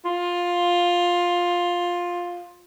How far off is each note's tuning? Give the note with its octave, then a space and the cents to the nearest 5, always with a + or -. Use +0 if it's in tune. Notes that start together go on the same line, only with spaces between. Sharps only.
F4 +10